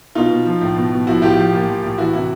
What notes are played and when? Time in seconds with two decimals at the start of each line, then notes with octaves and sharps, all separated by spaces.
0.15 B2 D#4 F4
0.30 B2
0.45 F3
0.61 A2
0.76 B2
0.92 B2
1.07 F3 E4 F#4
1.22 A2 F4 G4
1.37 F3
1.53 A#2
1.68 F3
1.83 A2
1.98 E3 E4 F#4
2.13 C3 E4 F#4